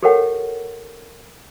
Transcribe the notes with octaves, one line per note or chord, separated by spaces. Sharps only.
G4 A4 A#4 C#5 F#5 G5